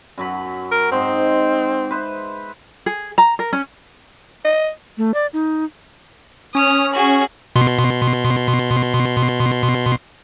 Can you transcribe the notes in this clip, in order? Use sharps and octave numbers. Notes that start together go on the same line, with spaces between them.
F#2 F#3 B5
A#4
G#2 C4 D#4 C5
B4 C5 E5
G#4
A#5
A#4
C#4
D#5
A3
D5
D#4
C#4 D#6 F6
F#4 G#4
B2 C6